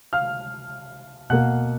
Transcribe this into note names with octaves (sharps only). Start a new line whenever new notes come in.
F5 F6
B2 A#3 F#5 F#6